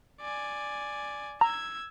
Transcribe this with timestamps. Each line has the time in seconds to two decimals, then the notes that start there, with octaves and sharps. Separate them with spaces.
0.21 D5 G#5
1.41 A#5 E6 G#6